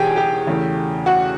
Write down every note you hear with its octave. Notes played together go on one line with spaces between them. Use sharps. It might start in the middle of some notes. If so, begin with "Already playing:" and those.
Already playing: E1 E2 B2 G4 G#4 G5 G#5
G4 G5
E2 C#3 E3 A3
F#4 F#5